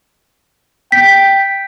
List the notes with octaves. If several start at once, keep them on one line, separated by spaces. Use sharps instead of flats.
G5 B6